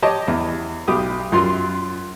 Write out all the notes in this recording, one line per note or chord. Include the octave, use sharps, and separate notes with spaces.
G4 C#5 D#5 A5
E2
B1 G4 D#6
F#2 F4 C6